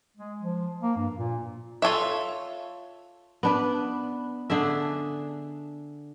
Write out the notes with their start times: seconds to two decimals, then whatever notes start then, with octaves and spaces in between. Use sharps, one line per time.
0.17 G#3
0.40 F3
0.82 A#3
0.97 G2
1.14 A#2
1.82 F4 A4 C#5 E5
3.43 B3 D4 B4
4.50 D3 D4 G#4 E5